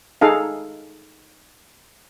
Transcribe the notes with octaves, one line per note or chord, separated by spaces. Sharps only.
D#4 G#4 A4 F5